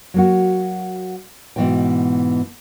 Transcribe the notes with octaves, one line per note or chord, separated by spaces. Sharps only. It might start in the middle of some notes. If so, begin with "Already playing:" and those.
F#3 A#3 F#4
G#2 B2 D#3 E3 B3 G5